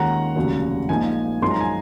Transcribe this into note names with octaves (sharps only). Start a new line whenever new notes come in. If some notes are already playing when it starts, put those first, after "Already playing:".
Already playing: D#2 D#3 G#3 C#4 F4 F#5 A#5
F1 D#2 C#3 F#3
A#1 A#2 F3 G#3 D#4 G#5
F#2 F3 G#3 D#4 C6
A#5
G#5